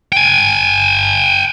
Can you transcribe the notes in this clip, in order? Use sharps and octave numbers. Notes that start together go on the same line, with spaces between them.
G5 G#5